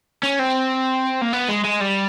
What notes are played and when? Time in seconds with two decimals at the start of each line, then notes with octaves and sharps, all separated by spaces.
0.23 C#4
0.39 C4
1.22 A#3
1.33 B3
1.49 G#3
1.65 G#3
1.81 G3